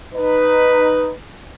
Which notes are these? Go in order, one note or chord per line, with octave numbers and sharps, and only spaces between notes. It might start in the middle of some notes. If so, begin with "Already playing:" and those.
D#4 B4